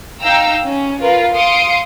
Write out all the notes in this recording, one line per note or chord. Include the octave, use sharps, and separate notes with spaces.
D#4 F5 G5 A#5 E6
C#4
F4 A#4 B4
F5 C6 D#6 C#7 D7